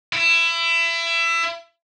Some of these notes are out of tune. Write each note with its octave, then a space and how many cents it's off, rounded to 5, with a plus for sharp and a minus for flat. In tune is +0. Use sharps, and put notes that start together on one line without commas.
E4 +25